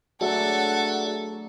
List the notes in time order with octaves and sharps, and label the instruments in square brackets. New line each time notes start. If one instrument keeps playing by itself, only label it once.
[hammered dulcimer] F#3 A3 D4 [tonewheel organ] F#4 G#4 D5 [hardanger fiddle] A4 [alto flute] F#5